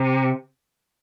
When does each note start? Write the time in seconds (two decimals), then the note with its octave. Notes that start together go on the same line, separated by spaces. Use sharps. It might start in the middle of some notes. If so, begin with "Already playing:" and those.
Already playing: C3